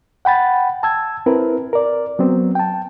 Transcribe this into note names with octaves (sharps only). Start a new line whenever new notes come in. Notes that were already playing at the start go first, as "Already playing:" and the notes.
F#5 G5 B5 A6
A5 E6 G#6
C4 E4 A#4 B4
A#4 D5
F#3 B3 C4
G5 A5